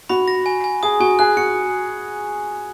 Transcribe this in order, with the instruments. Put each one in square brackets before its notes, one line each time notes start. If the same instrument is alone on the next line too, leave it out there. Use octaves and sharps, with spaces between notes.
[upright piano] F#4 [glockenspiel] B5
[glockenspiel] A#6
G#5
G#5
[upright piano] G#4 [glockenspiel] D#6
[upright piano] F#4 [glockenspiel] G#5
[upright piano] G#4 [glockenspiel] F#6
[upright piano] F#4 [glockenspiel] C#7